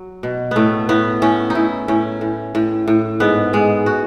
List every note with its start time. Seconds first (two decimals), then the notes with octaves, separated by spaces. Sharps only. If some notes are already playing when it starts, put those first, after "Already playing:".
Already playing: F#3
0.23 B2
0.51 A2 A3 B3
0.89 A2 B3
1.22 A2 C#4
1.50 D#4
1.55 A2 E4
1.88 A2 C#4
2.21 A2
2.55 A2
2.88 A2
3.20 G#2 B3
3.53 G#2 G#3
3.86 F#4